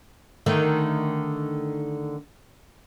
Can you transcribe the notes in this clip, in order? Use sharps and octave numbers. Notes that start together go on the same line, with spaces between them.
D3 D#3 A3